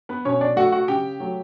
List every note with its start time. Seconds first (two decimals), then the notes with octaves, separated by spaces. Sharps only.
0.09 B3 B4
0.25 B2 C#4 C#5
0.41 D4 D5
0.56 A3 F#4 F#5
0.72 F#4 F#5
0.88 C#3 G4 G5
1.20 F#3 A3